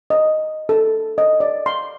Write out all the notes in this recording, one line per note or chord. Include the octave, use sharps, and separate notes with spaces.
D#5
A4
D#5
D5
C6